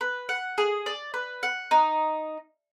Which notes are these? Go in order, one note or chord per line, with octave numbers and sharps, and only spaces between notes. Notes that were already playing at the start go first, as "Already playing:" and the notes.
B4
F#5
G#4
D5
B4
F#5
D#4